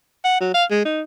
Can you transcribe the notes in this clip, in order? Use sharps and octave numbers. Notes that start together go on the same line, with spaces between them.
F#5
F#3
F5
G#3
D#4